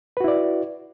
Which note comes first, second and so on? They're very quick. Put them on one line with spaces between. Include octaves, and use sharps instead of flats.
B4 F#4 E4 D5